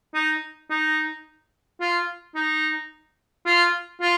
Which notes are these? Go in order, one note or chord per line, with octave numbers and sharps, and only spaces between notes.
D#4
D#4
F4
D#4
F4
F4